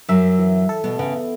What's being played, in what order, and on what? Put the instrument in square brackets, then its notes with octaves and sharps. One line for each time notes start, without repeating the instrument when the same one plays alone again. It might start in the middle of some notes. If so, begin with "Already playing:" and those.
[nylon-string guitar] F#2 F#3 [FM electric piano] E5
[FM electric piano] E3
A4
[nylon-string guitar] B2 B3
[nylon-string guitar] C#3 [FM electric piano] B3